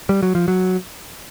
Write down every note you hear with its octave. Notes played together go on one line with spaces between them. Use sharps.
G3
F#3
F3
F#3